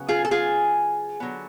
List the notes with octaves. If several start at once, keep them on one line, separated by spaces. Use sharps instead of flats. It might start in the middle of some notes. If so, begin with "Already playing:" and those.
Already playing: C#3 F#3 B3
F4 G#4
A4
F4 G#4
D3 F#3 B3